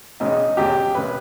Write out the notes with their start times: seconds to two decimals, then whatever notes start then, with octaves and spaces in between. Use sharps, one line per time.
0.20 E1 E2 C#3 D#4
0.57 E1 E2 C#3 G4
0.95 E1 C#3 B4